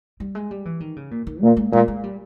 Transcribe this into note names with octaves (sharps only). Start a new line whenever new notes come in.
G3
G#3
G3
E3
D#3
C#3
A#2
D#3
A#2 A#3
G#3
A#2 G#3
G#3
G3